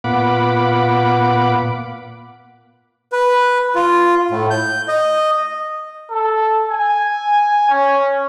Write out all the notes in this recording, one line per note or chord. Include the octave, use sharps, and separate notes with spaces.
A#2 B3 F4 F#5 B5 D6
B4
F4
A2
G6
D#5
A4
G#5
C#4